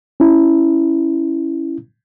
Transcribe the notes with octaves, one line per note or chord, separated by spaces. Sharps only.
C#4 E4